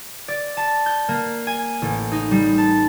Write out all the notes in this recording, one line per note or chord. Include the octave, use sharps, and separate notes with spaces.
D5
A5
G6
A#3
G#5
A1
D#4
G3
A5